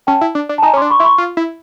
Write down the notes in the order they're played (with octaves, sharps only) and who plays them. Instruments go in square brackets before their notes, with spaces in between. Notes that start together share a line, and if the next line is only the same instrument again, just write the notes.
[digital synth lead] C#4 [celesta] G5 A5
[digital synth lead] E4
D4
D4
[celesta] A5
[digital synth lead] D#4 [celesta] G#5 A#5
[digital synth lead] C#4
[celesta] C6 D6
[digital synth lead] D4
[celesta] B5 C#6
[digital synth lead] E4 [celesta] C6
[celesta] B5 C#6
[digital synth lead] F4
E4